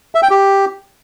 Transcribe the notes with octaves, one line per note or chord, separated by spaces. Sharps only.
E5
G5
G4